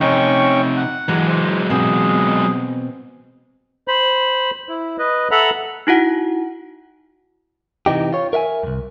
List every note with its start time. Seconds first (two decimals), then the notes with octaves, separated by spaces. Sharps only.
0.01 F2 C3 C#4 D#4 G5 C#6
0.77 F#5
1.08 E3 F#3 G#3
1.28 C5
1.70 B2 C4 G#4
3.88 C5 B5
4.69 E4
4.98 B4 D#5
5.31 A4 E5 F#5 A#5 B5
5.87 D#4 E4 F#4 F#5
7.86 C3 E3 D#4 G4
8.13 F4 C#5
8.33 A#4 E5 F5 G#5
8.63 C2 F#2